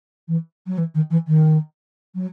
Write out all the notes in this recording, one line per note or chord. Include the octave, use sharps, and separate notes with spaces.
E3
F#3
E3
D#3
E3
D#3
F#3